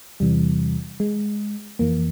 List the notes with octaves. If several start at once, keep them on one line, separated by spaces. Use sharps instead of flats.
E2 C3 E3 G3
G#3
F2 E3 A#3